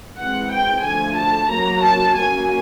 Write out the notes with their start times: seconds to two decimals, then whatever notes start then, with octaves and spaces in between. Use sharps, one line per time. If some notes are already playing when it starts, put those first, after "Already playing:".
0.18 E3 G#3 C4 F#5
0.52 G5
0.83 D3 F3 A3 G#5
1.16 A5
1.49 F#3 A#3 C#4 A#5
1.83 A5
2.15 F#3 A#3 C#4 G#5